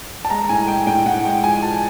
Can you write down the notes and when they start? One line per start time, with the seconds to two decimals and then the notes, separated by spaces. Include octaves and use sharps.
0.25 A5
0.30 G#3 A#5
0.49 A2 G#5
0.68 G#3 G5
0.87 A2 G5
1.06 A2 F#5
1.25 G#3 G5
1.44 F3 G#5
1.63 F3 A5